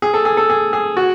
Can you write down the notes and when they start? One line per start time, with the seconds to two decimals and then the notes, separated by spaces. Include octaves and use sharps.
0.02 G#4
0.14 A4
0.25 G#4
0.37 A4
0.50 G#4
0.73 G#4
0.97 F#4